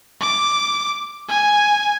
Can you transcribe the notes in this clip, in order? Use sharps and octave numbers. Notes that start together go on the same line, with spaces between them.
D6
G#5